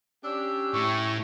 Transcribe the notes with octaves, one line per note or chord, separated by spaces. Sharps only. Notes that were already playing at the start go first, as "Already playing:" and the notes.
C#4 D4 G4 E6
A2 C#6